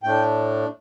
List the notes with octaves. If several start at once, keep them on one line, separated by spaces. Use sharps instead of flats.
A2 A3 D4 G5